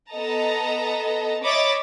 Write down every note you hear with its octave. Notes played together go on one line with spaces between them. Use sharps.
B3 A4 D#5 A5 A#5
C#5 D#5 E5 B5 D6 A6